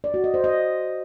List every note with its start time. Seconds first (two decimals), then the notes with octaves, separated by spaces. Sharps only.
0.04 D5
0.14 F#4
0.24 D#5
0.34 C5
0.44 D#5